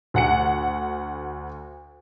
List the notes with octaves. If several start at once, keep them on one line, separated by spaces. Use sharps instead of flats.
D2 F#5 C#7